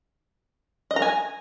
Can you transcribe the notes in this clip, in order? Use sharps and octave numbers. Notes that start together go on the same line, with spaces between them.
D#5
A#5
G#5